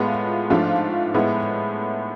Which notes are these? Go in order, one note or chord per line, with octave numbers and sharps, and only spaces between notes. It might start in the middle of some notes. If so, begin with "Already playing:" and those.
Already playing: A2 G#3 B3 F4
G#2 F3 A3 D4 F4
A2 G#3 B3 E4